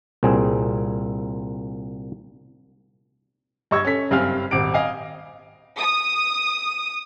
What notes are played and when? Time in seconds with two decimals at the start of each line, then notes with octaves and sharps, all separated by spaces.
0.23 C2 A#2 C4 G#4 G#5
3.71 G2 D#5 C#6 E6 G#6
3.85 C#4 A4 B6
4.11 F#1 G2 C4 F5 G#5 F6
4.51 D#1 G#1 D6 D7
4.74 D#5 F5 G#5
5.78 D#6